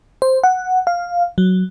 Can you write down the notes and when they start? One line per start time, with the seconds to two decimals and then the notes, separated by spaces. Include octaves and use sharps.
0.22 C5
0.43 F#5
0.87 F5
1.38 F#3